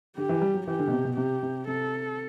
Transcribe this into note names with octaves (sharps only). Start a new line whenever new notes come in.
D3 G4
E3
G3
F#3
E3 G4
D3
B2
C3
B2
C3 G4
C3
C3 A4